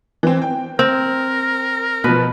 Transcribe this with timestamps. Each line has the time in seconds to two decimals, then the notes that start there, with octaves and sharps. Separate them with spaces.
0.23 E3 C4
0.42 G5
0.79 C4 A#4
2.04 B2 F3 B4